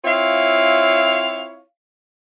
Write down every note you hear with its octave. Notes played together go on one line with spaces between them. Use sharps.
C4 E4 F4 C#5 F5